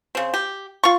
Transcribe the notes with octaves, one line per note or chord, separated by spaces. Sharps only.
C#3 C4
G4
F4 C#6